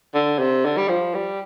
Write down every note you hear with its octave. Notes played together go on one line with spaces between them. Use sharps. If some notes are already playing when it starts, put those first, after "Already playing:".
D3
C3
D3
G3
F3
G3